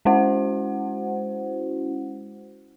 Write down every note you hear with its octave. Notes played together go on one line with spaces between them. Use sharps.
G#3 C#4 E4 F#4 C5 F#5